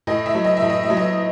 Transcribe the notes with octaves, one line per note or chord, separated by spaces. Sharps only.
A2 D#5
E5
F#3
D#5
E5
A2
D#5
E5
F#3
D#5